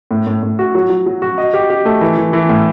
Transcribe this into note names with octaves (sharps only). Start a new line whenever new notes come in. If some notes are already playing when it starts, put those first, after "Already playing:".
A2
A2
A2
F#4
F#3
F#3
F#3
F#4
D#5
G4
G4
A3
E3
E3
E3
A2